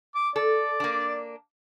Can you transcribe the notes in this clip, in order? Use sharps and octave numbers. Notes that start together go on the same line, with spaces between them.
D6
A4 D5
A#3 D4